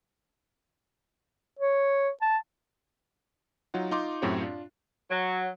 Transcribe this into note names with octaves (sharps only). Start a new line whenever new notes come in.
C#5
A5
F#3 D#4 F4 F#5
D#4 F4 C6 D6
F#2 A2 C4 F#4 G4 C#5
D4 F4
F#3